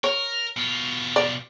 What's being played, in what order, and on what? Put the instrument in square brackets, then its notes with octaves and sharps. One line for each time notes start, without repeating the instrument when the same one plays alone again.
[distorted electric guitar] A#4 [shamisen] C#5
[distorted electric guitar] B2 F4
[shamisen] D5